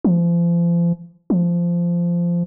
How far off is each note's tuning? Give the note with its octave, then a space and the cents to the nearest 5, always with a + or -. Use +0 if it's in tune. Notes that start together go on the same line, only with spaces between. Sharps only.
F3 -35
F3 -15